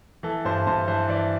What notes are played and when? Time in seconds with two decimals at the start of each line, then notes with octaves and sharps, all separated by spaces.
0.23 E3 A4
0.45 G2 C5
0.67 G2 C5
0.87 E3 C5
1.09 E3 D5